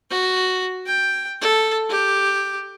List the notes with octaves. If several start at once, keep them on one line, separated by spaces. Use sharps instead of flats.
F#4
G5
A4
G4